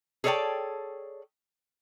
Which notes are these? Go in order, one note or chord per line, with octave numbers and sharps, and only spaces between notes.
G#4 A4 C#5 D5 G5 A5